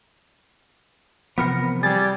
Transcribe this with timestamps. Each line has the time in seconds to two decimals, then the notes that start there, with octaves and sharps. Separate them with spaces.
1.38 C3 E3 F3 B3 A#4 F#5
1.83 G3 G#4 A6